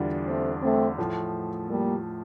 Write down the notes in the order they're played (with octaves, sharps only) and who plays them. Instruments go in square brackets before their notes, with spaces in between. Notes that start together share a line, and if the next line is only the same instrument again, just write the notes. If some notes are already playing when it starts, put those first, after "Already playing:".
Already playing: [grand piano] E2 D3 G3 D4 F4
[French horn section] A3 C4
A3 C4
[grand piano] A2 F3 A3
[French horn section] G3 A#3